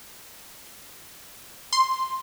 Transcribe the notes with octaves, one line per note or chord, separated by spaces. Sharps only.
C6